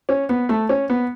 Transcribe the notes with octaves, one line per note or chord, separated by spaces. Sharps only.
C#4
B3
A3
C#4
B3